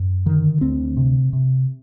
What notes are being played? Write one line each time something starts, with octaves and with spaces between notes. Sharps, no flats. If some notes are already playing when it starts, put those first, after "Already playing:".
Already playing: F#2
D3 D#3
D2 C4
C3
C3